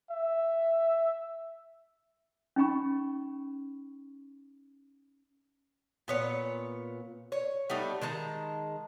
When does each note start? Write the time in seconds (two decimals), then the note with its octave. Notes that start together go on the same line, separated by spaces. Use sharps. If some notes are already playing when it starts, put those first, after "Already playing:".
0.11 E5
2.56 C#4 D#4 G5 B5 C#6
6.08 A#2 B3 C#5
7.32 C#5
7.70 G3 A3 B3 D#4
8.01 D#3 G#3 A5 A#5